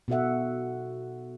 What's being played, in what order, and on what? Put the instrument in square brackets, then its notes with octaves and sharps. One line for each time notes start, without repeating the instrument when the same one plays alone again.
[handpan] B2 D#4 F#4 A4 E5 F#5